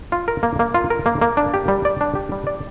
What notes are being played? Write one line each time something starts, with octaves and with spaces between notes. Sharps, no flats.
F4
A#4
A#3
A#3
F4
A#4
A#3
A#3
D4
G4
G3
D5
D4
G4
G3
D5